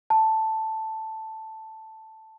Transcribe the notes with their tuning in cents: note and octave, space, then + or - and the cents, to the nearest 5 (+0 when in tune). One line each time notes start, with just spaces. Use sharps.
A5 +0